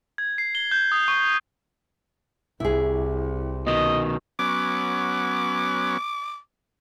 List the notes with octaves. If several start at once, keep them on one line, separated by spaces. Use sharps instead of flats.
G#6
C7
G7
G6
D#6
C#6
C2 E4 G#4
B2 D#3 D#5
F#3 B3 C#4 D6